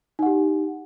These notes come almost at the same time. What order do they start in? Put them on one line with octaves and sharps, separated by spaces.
D#4 F#5 G4